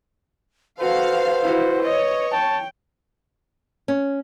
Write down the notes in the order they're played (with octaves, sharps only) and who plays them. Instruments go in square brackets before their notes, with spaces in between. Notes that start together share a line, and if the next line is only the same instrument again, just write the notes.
[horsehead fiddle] F#4 A4 [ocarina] B4 [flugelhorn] C5 [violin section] F5
[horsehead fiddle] E4 F#4
[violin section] C#5 [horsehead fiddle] D#5
[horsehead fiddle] G5 [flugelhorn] A5
[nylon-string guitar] C#4